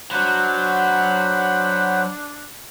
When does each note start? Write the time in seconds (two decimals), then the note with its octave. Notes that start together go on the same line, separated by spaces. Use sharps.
0.11 F#3 D4 C5 F#5 B5